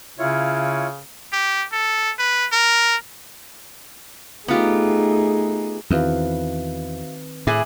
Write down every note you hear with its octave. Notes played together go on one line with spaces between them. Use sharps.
C#3 E4 F4 C#5
G4
A4
B4
A#4
A3 B3 D#4 F4 G4 G#4
E2 D#3 C4 F#4 B4 E5 F5
A2 E4 G#4 D6 F#6 F#7